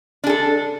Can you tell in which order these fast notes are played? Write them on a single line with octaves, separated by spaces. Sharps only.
D4 G#4 A4